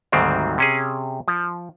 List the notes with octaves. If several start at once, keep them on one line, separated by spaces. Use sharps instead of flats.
D2 G#2 D#3 F#3 G3 C4
C3 C#4 G#4
F3